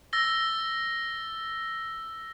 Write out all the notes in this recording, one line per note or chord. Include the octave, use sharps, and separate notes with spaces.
E6 A6 A#6 G7